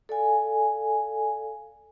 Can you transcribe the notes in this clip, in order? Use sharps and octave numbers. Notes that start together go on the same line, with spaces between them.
A4 D5 F5 G#5